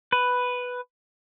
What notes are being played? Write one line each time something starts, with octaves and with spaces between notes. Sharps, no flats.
B4